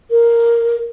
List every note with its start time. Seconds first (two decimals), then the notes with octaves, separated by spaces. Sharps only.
0.11 A#4